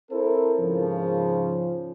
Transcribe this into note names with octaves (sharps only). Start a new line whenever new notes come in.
C4 E4 A4 A#4 C5
G#2 C#3 F3